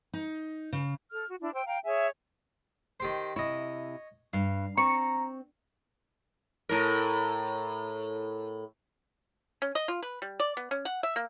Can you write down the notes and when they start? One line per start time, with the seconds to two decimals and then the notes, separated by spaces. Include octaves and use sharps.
0.13 D#4
0.73 C#3
1.10 A4 F6
1.28 F#4
1.40 D4 E4
1.55 C5 G5 E6
1.66 F5 G5 A#5
1.85 G#4 C#5 E5 G#5
3.00 D#3 G4 C5
3.36 C3 E4 C#5 D#5
4.33 G2 F5
4.78 C4 A#5 C#6
6.69 A2 A#4
9.62 C#4
9.75 D#5
9.88 F4
10.03 B4
10.22 G3
10.40 D5
10.57 B3
10.71 C#4
10.85 F#5
11.03 E5
11.16 A#3